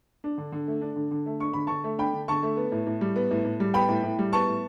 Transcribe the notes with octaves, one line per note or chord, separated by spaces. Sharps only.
D4
D3
D3
A3
D4
D3
D3
A3
D4 C#6
D3 B5
D3 A5 C#6
A3
D4 G5 B5
D3
D3 A5 C#6
A3
B3
A2
A2
G3
B3
A2
A2
G3
B3 G5 B5
A2
A2
G3
B3 A5 C#6
A2